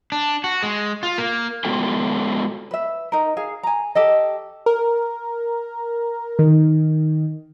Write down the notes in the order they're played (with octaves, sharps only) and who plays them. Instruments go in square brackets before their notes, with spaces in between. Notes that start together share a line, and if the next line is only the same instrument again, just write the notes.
[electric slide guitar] D4
F#4
G#3
F4
A#3
G#3 B3 F4 F#4 A4 G5
[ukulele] B4 E5
D#4 A#4
G#4 F5
G#5 A#5
G4 A4 D#5
[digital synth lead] A#4
D#3